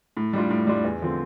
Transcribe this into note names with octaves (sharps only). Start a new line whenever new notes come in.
A2
G3 D4 F4
A2
G3 D4 F4
E2
D3 F3 C4